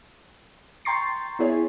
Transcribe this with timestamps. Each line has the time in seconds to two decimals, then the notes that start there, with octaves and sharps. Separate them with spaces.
0.85 G5 A#5 C6 C#6 A6 C7
1.39 B3 E4 G#4 C#5